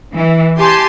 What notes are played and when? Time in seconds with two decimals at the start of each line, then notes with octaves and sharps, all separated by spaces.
0.14 E3
0.57 G4 G#5 A5 C6